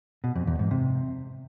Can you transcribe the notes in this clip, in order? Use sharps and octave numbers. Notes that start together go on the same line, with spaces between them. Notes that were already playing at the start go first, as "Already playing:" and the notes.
B2
F2
E2
G#2
C3